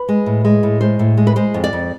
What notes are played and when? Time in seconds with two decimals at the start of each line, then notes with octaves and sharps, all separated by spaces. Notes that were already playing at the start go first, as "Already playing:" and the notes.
Already playing: B4
0.09 G#3
0.26 A2
0.45 G#3
0.63 A2
0.81 G#3 C5
0.99 A2
1.17 G#3
1.27 B4
1.36 G#3 C5
1.54 F2
1.64 D5
1.73 F2